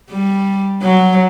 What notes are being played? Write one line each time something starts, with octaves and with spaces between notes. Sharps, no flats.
G3
F#3